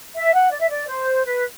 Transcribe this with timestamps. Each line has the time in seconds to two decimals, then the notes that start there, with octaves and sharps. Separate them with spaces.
0.15 E5
0.34 F#5
0.51 D5
0.60 E5
0.69 D5
0.88 C5
1.25 B4